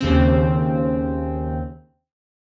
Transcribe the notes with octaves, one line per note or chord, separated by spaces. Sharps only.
D#2 C#3 C4